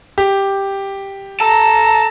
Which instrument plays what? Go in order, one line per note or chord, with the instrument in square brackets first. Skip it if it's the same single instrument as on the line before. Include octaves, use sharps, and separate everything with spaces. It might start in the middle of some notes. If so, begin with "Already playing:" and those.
[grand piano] G4
[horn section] A4 A#5 [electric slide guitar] A5